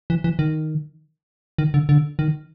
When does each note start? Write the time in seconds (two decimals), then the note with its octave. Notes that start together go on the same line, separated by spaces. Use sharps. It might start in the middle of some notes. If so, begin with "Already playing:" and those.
0.10 E3
0.24 E3
0.39 D#3
1.58 D#3
1.74 D3
1.89 D3
2.19 D#3